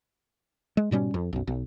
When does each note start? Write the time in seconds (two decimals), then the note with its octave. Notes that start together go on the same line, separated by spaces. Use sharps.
0.77 G#3
0.91 G#2 B2 G3 C#4
1.14 F2
1.33 B1 F#2
1.47 B1